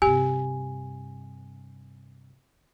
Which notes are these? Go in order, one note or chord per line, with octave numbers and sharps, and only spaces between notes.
G2 C3 G4 G#5